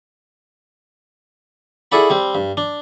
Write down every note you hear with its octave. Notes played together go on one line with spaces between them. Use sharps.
E4 G#4 A4 D5 F#5 B5
G3 C4
G2
D4